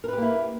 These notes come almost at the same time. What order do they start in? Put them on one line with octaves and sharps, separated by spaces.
A#4 B4 G4 A#3 E4